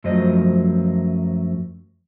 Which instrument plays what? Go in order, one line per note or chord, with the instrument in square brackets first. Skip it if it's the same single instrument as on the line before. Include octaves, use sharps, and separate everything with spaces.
[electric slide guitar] F#2 F3 F#3 A3 C5 D#5